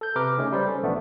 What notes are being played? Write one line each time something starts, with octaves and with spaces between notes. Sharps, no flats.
A4 G6
C3 B4 A#5 D6 F6
C#3 A3 C#4 D#4 G#4
G3 C5 D5
C#4 A4
A#1 E3 A3 B3 D4